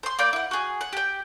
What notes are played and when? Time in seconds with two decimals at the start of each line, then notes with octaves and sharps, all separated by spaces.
0.03 C5 C6
0.19 A#3 D5 B5 G6
0.33 E4 F#5
0.51 F#4 G#4
0.81 F#5
0.93 G4 G5